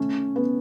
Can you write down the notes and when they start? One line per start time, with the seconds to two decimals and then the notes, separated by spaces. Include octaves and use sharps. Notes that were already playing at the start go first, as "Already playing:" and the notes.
Already playing: A3 C#4
0.36 B3